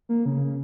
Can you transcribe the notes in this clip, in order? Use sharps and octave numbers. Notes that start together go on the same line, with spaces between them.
A#3
C#3